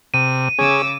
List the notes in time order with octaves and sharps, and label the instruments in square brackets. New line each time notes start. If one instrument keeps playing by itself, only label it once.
[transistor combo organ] C3 [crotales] D#7
[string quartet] C#3 D6 E6 [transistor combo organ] C#4 G#4